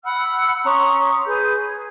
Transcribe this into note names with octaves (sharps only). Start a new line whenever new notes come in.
F#5 B5 E6 F6
C#4 A#5 C6 D#6
G#4 B4 G6
G#6